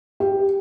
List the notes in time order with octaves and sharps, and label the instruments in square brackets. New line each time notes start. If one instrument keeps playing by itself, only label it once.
[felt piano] G4